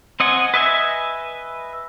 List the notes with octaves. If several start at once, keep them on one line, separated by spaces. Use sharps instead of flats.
C4 D#5 F#5 G#5
B4 D#5 E5 G#5